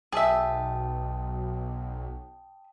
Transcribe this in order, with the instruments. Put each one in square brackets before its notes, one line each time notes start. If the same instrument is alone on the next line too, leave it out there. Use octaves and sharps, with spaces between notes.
[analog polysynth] B1 [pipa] G#4 E5 [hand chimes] G5 A5 D#6